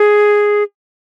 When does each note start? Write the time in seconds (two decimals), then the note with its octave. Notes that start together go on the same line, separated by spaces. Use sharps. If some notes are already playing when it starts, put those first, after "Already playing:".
Already playing: G#4